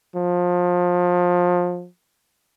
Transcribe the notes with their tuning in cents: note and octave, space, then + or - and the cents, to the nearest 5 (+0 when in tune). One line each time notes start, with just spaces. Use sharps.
F3 +25